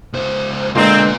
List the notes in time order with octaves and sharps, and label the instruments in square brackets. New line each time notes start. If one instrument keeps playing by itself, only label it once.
[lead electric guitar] C#2 C5
[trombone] A#2 [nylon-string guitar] D3 G#3 B3 [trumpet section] C4 [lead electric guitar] F4 D5